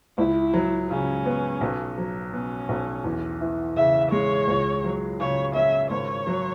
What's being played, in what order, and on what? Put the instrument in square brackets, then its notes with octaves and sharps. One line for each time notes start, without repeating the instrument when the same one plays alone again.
[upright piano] C#2 [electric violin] E4
[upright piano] F#3
[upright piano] C#3 [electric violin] C#4
[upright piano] B3
B1
F#3
[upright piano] B2 [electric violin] C#4
[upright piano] B1
E2
E3
[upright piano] C#3 [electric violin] E5
[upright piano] G#3 [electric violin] C#5
[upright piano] C#2
F#3
[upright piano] C#3 [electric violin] C#5
[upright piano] C#4 [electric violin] E5
[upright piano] G#1 [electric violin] C#5
[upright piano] F#3